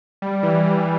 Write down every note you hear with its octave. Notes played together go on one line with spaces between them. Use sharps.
G3
E3
E3